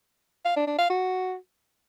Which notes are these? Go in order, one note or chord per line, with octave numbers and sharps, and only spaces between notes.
F5
D4
D4
F5
F#4